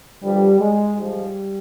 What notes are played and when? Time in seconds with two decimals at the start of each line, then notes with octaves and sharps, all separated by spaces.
0.22 G2 D3 F3 G3
0.59 G#3
0.96 G#2 F3 G3